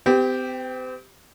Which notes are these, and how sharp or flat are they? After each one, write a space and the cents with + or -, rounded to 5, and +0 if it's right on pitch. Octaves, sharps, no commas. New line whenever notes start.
C4 -40 G4 +0